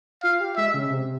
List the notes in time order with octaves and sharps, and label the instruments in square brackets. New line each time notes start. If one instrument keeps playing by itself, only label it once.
[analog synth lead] F4 [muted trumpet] F5
[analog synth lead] G4
[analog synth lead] G#3 [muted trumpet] E5
[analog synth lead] C#3
C3